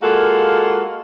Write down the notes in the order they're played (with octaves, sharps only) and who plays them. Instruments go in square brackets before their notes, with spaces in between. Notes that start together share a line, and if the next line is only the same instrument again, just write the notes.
[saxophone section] G#3 A#3 F4 F#4 A4